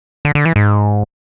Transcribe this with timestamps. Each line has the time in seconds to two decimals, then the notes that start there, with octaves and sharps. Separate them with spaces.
0.25 D3
0.35 D3
0.45 E3
0.56 G#2